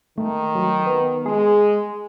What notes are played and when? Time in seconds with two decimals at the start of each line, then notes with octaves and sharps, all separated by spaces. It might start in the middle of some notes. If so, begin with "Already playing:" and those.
0.18 D#3 A3
0.55 F#3
0.86 B3
1.26 G#3 G#4